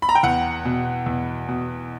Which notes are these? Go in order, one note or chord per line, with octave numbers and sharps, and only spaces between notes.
B5
A#5
G5
E2 F#5
B2
E2
B2